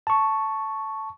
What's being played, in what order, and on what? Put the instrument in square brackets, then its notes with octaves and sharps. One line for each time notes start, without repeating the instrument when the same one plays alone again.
[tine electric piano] A5 C#6